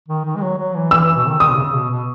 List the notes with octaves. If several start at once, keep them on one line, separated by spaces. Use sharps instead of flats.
D#3
D#3
G#3
F#3
F#3
E3
E3 E6
E3
B2
D#3
D#3 D#6
B2
C#3
B2
B2